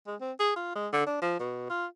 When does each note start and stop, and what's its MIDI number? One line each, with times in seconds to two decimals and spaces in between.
0.07 0.16 56
0.21 0.32 60
0.40 0.51 68
0.56 0.74 65
0.75 0.88 56
0.93 1.06 50
1.07 1.20 62
1.22 1.36 53
1.40 1.68 47
1.70 1.86 65